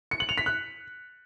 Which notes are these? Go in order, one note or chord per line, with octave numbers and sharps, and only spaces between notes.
C#7
F#7
F7
B6
F#6